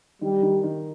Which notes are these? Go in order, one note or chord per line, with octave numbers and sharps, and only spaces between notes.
D#3 G3
D#3
D#3